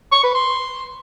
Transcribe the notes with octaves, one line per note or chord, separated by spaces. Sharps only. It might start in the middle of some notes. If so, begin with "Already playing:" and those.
C#6
B4
C6